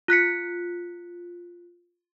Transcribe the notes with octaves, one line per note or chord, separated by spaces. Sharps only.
F4 F#6 B6 C#7